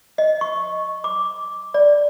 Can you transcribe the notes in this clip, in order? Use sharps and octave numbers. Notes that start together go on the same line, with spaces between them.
D#5
C#6
D6
D5